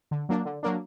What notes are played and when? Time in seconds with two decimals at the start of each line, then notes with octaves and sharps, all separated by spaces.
0.11 D3
0.29 F#3 A#3 D4
0.45 D3
0.63 F#3 A#3 D4